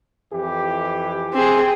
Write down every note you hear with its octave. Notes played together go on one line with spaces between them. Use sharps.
F2 E3 G4
C4 G#4